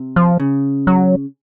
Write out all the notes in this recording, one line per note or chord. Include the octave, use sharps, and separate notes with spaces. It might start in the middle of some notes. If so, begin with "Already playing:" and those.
Already playing: C3
F3
C#3
F#3